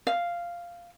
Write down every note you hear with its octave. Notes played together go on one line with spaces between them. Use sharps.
F5